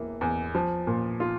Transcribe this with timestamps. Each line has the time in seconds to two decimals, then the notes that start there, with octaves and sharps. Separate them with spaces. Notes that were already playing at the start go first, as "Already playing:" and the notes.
Already playing: E1 E3 A#3
0.21 E2
0.55 F3
0.87 A#2
1.20 F4